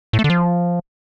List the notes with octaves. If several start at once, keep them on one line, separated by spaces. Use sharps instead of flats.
A2
A3
D3
F3